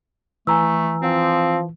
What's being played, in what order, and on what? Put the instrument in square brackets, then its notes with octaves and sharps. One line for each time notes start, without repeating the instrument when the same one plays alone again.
[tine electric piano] E3 [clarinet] A3 [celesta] G#5 A#5 E6
[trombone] F3 [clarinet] C4